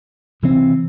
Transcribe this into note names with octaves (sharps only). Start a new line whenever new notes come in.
C3 E3 C4